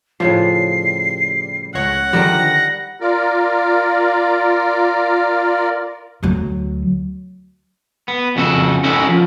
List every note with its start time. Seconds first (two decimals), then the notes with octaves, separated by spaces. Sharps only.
0.20 A2 C#3 F3 G3 C7
1.74 C#2 C#5 F#5 A#6
2.13 D3 D#3 F3 G3 A#4 A#6
3.01 F4 A#4 D5
6.23 D2 F#3
8.08 B3
8.36 F2 C#3 F#4 A4
8.84 C#4 D#4 E4 F#4 A4 A#4
9.09 F3